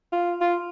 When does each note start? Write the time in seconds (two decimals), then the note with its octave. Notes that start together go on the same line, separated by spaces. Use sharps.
0.12 F4
0.41 F4